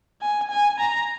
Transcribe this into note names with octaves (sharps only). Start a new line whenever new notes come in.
G#5
G#5
A#5